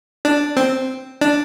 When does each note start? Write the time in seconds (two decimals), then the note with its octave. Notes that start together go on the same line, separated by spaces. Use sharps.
0.25 D4
0.57 C4
1.21 D4